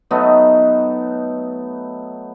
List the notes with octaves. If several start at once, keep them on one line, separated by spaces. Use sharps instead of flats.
F#3 A3 B3 D#4